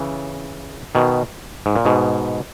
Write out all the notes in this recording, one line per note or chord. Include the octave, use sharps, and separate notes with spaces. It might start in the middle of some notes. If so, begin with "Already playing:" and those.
Already playing: C#3 E3
B2 D#3
G#2
A#2
G#2 B2